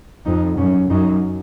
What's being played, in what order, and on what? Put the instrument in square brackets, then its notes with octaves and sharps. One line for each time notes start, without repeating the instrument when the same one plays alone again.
[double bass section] F2 [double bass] D#4
[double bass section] F#2 [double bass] C#4
[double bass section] F#2 [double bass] D#4